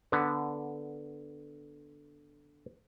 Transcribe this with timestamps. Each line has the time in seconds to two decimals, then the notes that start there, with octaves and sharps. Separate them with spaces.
0.12 D3 B3